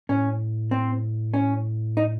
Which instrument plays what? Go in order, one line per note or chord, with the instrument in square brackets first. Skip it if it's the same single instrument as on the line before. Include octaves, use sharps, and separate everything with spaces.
[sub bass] A2 [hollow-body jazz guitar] C#4
[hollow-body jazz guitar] C4
C#4
D#4